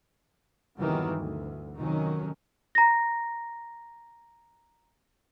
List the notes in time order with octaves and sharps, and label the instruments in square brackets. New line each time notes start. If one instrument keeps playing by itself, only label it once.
[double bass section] F1 E2 G2 D#3 E3 F#3
D2
F1 D#3 F#3 C#4
[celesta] A#5 A#6